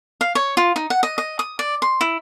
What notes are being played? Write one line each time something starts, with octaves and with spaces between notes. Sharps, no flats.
F5
C#5
F4
D#4
F#5
D#5
D#5
D#6
D5
C6
E4